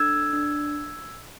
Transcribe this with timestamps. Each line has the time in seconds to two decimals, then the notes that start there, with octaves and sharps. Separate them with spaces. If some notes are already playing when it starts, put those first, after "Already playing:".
Already playing: D4 A4 E6 G#6
0.33 D4